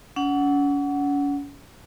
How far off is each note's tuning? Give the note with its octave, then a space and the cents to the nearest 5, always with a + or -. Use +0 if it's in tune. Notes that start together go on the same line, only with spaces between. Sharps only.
C#4 +40 F#5 +0